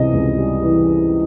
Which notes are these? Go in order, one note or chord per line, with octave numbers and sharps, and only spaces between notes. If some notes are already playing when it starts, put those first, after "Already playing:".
Already playing: C#2 C3 E3 G3 D#5
C#2
G3
E3